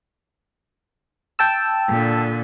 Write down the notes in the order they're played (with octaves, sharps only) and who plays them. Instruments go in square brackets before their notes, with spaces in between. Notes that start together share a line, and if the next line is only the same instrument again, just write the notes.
[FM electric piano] G5 A5 E6
[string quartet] A#2 D3